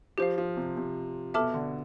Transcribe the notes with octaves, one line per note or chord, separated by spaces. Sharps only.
F3 G4 C5 F5
F3
C3
C3
B2 A4 E5 A5 D6 F6
D3